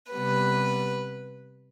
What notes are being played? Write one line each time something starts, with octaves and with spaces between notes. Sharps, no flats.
C3 G3 B3 B4